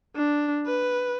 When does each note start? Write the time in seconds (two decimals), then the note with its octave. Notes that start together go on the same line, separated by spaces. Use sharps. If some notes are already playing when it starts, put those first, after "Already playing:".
0.16 D4
0.66 B4